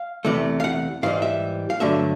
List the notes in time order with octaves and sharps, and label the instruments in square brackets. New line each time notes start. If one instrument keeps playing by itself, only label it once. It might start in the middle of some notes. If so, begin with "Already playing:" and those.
Already playing: [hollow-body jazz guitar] F5
E2 C3 E3 A3
F5
F#5
G#2 E3 G3 F5
E5
F5
G2 D3 F#3 A3 E5